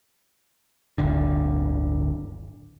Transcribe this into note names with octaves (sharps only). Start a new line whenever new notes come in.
D1 G1 D3